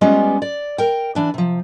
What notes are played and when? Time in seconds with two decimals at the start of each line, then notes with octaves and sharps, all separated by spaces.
0.01 G3 G#3 B3 C#4 F4
0.42 D5
0.78 A#4 G5
1.15 E3 D4 B4
1.34 C3 F3